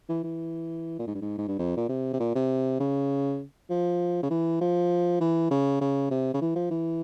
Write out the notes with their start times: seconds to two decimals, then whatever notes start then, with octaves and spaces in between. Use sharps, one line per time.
0.09 E3
0.23 E3
0.99 A#2
1.07 G#2
1.15 G2
1.22 G#2
1.38 G#2
1.48 G2
1.59 F2
1.77 A#2
1.89 C3
2.13 C3
2.20 A#2
2.35 C3
2.80 C#3
3.70 F3
4.23 C#3
4.30 E3
4.61 F3
5.20 E3
5.51 C#3
5.81 C#3
6.11 C3
6.34 C#3
6.42 E3
6.56 F3
6.71 E3